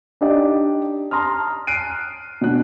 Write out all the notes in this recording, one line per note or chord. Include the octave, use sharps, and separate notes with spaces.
D4 D#4 G4 D5 D#5
A5 A#5 C6 D#6 F6
F6 F#6 C7 D7 D#7
B2 D4 F#6